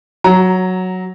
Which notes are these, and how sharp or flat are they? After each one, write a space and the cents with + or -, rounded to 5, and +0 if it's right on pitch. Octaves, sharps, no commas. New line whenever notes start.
F#3 +0 A#5 +0